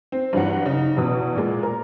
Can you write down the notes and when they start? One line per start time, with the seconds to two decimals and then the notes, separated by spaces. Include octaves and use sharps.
0.12 C4
0.33 G2 E3 F#3 F#5
0.66 C#3 D#4
0.97 E2 B2 D#6
1.36 A#2 G#3
1.63 A#4